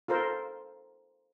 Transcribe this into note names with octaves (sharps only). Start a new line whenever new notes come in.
F4 A4 A#4 C5